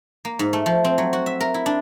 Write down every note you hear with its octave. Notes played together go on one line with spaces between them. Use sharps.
A#3
G#2
A3
F3
C4
F#3
F#4
E5
A#4
E4
D4